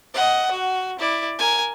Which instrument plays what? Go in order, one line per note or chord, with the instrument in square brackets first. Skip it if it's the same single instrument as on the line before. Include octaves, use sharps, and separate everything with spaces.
[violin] D#5 F#5
F#4
E4 D5
A#4 G#5